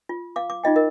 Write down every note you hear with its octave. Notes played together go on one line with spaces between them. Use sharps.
F4
F5 D6
D6
D#4 F4 D#5 G5
A#4 D#5